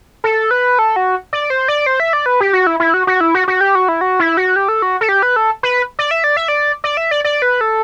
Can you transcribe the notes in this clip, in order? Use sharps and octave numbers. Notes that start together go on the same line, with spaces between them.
A4
B4
A4
F#4
D5
C5
D5
C5
E5
D5
B4
G4
F#4
E4
E4
F#4
F#4
E4
F#4
F#4
G4
F#4
E4
F#4
E4
F#4
G4
A4
F#4
A4
G4
B4
A4
B4
D5
E5
D5
E5
D5
D5
E5
D5
D5
B4
A4